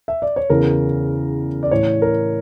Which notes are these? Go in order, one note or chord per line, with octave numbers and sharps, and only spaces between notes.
E5
D5
C#5
E2 C#3 E3 A#4
D5
A2 E3 C#5
A#4